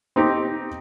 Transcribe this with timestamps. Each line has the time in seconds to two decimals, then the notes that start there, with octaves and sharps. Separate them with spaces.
0.16 C4 D#4 G4